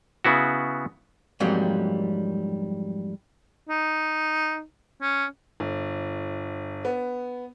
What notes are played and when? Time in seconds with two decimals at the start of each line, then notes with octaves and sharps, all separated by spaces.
0.24 C#3 B3 E4 F#4
1.40 F2 G#2 F#3 G3 A#3
3.69 D#4
5.02 C#4
5.60 G1
6.85 B3